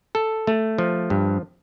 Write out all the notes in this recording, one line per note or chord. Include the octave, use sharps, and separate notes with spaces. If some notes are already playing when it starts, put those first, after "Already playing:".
A4
A3
F3
G2